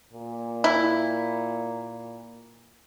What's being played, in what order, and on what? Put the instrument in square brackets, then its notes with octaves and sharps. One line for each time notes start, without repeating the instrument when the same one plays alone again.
[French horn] A#2
[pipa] E4